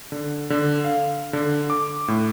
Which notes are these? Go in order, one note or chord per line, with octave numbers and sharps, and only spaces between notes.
D3
D3
F5
D3
D6
A2